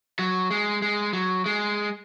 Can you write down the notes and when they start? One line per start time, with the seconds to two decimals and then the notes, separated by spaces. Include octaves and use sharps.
0.19 F#3
0.51 G#3
0.82 G#3
1.13 F#3
1.46 G#3